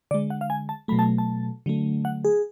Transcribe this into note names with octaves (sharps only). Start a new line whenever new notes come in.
D3 G#3 D5
F#5
F5
G#5
A5
B2 F#3 A3 B5
A5
A5
D3 F#3 A3
F#5
G#4